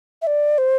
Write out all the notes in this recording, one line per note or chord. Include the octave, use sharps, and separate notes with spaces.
E5
D5
C5